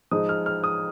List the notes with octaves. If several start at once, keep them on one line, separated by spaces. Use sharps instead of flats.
F3 G#3 D#4 D#6
F6
F6
D#6